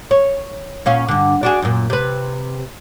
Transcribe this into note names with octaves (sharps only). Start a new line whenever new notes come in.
C#5
A#2 C#4 F5
G2 D3
D4 F#4 G#4
F#2 A#2
C3 B4